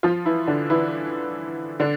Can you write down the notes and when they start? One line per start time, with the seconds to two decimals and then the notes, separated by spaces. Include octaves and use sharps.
0.03 F3 F4
0.25 E3 E4
0.47 D3 D4
0.70 E3 E4
1.80 D3 D4